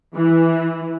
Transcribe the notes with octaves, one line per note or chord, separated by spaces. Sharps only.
E3